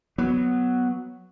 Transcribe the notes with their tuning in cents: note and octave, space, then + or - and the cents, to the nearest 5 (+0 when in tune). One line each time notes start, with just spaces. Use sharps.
F#3 +0 B3 +0